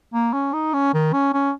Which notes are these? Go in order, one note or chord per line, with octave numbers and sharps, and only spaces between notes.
A#3
C#4
D#4
C#4
D#3
C#4
C#4